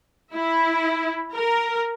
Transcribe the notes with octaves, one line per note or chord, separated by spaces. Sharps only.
E4
A#4